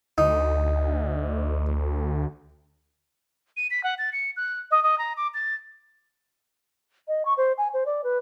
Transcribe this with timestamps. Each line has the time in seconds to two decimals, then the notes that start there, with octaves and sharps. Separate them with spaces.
0.18 D2 D#4
3.57 D#7
3.70 B6
3.84 F#5
3.98 A6
4.13 C#7
4.37 F#6
4.71 D#5
4.83 D#5
4.98 A#5
5.17 D6
5.34 A6
7.08 D#5
7.25 C#6
7.37 C5
7.58 G#5
7.74 C5
7.86 D5
8.04 B4